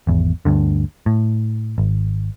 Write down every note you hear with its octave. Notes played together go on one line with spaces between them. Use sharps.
G#1 E2
D2 G2 D3
A2
G#1